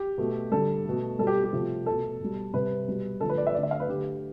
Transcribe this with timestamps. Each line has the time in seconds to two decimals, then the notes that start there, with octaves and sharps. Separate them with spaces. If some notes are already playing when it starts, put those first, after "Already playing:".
Already playing: G4
0.18 B2 A3
0.52 D3 G3 A4
0.85 B2 A3
1.19 B2 G3 A4
1.27 G4
1.44 G4
1.53 C3 F3 A3
1.86 B2 A3 A4
2.20 B2 G3
2.54 C3 G3 B4
2.88 B2 G3
3.20 D3 F3 A3 A4
3.30 B4
3.38 D5
3.47 E5
3.55 D3 A3 D5
3.63 E5
3.71 F5
3.80 B4
3.88 D3 A3 G4